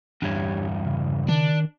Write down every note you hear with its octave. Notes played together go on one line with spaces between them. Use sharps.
E2 G2 D4 G4 C#5
C#3
D#3 D4